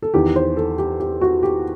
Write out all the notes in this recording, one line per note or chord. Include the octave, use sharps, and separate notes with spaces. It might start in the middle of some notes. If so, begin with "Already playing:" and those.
A4
E2 D#3 G4
C5
A4
G4
G4
F#4
G4